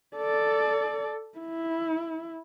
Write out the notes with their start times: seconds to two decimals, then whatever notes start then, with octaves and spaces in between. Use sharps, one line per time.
0.17 A4 D5
1.38 E4